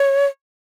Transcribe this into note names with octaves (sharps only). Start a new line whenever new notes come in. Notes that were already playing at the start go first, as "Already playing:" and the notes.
Already playing: C#5